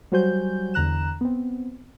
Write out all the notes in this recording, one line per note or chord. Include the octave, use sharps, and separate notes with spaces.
F#3 G3 F#4 C5 G#5 G6
E2 D3 A#5 F#6 E7
B3 C4